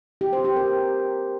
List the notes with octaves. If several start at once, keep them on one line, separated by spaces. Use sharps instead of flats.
G4
C5
G4
A#4